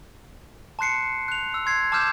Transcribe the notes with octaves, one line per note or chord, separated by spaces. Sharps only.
A5 C6 F#6 C7 C#7
F#6 F7
E6
C6 G#6 C7
A5 D6 E6 F6 G6 E7